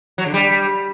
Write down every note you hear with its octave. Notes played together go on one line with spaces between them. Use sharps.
F#3
D3
G3